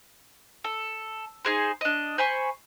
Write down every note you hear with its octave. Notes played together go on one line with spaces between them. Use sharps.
A4
D#4 G#4 C5
D4 D#5
C5 G#5 B5 C#6